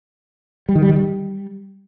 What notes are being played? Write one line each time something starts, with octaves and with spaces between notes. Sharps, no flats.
G3
D#3
G3
D#3
G3